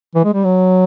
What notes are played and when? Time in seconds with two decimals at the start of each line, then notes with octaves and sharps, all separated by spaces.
0.15 E3
0.25 G#3
0.34 G3
0.44 F#3